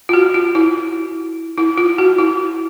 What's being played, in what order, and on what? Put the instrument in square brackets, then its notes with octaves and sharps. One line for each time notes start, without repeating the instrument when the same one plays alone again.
[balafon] F4
F#4
F4
E4
E4
F4
F#4
E4